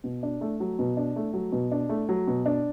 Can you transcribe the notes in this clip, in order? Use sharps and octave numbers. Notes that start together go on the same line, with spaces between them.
B2
D4
A3
F#3
B2
D4
A3
F#3
B2
D4
A3
F#3
B2
D4